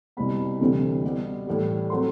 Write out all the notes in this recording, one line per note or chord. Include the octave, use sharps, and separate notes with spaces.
C2 B2 G3 C4 B5
D2 C3 E3 G3 C4
B2 G3 B3
A2 E3 G3
F#3 A3 C4 C6